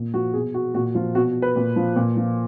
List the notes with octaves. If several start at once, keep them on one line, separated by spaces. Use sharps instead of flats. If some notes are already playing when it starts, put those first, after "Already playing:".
Already playing: A#2
F3 F#4
B2 G#4
F#4
A#2 F#4
F3 F4
B2 F#4
B4
A#2
F3
A#2
F3